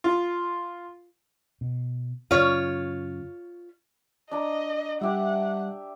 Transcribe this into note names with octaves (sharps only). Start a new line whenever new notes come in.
F4
B2
F#2 C#3 F4 C#5
D4 D#5 A#5
G3 G4 E5 F#5